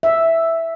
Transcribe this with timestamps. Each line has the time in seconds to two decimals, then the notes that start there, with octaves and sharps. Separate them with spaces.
0.03 E5